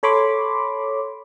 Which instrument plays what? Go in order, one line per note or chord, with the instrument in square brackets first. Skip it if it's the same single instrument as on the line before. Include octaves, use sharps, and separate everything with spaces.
[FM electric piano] A4 C#5 B5 C6 D6